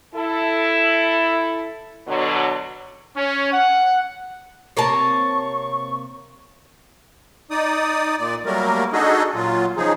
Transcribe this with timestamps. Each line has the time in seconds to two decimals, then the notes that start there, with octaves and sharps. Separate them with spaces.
0.15 E4 A4
2.07 B2 D3 F#3
3.16 C#4
3.51 F#5
4.77 C3 A#3 C#5 A5 C#6
7.51 D#4 D5 D#6
8.18 A#2 D5
8.46 F#3 G3 A3 A#3 A#4
8.93 D4 D#4 F#4 G#4 A4 D#5
9.35 A#2 F#3 F4
9.77 C#3 F3 D#4 G#4